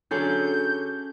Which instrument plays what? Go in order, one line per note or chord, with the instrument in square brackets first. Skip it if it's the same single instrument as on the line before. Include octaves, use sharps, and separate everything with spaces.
[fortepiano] D3 F#3 [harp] C#4 G#4 A4 [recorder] G6